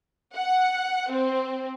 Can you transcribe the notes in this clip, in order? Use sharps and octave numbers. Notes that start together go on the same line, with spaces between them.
F#5
C4